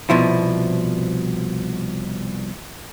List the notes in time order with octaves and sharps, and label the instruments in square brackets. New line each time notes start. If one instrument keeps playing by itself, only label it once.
[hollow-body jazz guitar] C2 B2 F3 E4